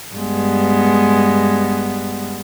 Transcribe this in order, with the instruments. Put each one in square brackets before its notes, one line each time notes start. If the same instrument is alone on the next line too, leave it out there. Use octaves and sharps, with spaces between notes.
[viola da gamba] G2 G#3 B3